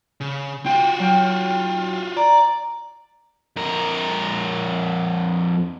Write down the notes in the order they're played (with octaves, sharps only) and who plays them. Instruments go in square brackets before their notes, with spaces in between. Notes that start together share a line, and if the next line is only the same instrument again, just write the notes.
[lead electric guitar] C#3
[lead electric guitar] F4 F#4 [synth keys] G5
[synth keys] F#3 G5 F6
[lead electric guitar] D5 [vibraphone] A#5
[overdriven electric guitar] F2 A#4